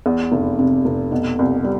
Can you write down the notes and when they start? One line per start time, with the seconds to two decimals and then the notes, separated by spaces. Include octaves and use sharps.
0.06 E2
0.32 F1
0.59 C3
0.85 F1
1.12 B2
1.39 C2
1.64 G3